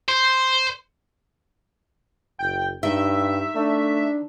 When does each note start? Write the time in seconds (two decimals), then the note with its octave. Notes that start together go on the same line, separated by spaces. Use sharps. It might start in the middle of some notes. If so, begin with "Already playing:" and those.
0.08 C5
2.39 F#1 G5
2.83 G2 D#3 E5
3.56 A3 D4